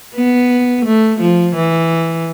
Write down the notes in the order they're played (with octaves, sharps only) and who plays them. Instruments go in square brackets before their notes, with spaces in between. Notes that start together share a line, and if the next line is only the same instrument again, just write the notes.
[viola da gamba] B3
A3
F3
E3